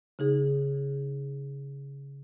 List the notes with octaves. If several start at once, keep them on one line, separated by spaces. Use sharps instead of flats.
C#3 D#4 G#4